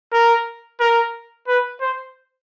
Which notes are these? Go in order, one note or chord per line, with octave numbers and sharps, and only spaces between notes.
A#4
A#4
B4
C5